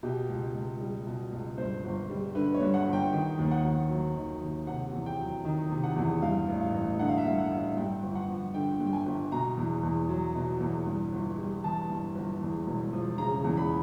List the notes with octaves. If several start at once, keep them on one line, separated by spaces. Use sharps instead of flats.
B2 G4
C#2
C#2
G3
B2
C#2
G2 C5
G1
G3
D3 B4
C#5
G2
F#5
G1
G5
D#3 G5
D#2
F#5
D#2
F#3
D#3
D#2
C3 F#5
E2
G5
F#3
D#3
C3
F#5
E2
G2 F5
A1
F5
A1
D3 F#5
F5
E5
G2 F5
F#5
A1
G2 G5
G1
F#5
F3
D3 G5
G2
G5
G#5
G1
B2 A#5
E2
E2
F#3
B2
E2
G2
G1
G3
E3 A5
G2
G1
E2
E1
F3
C#3 A#5
E2
B5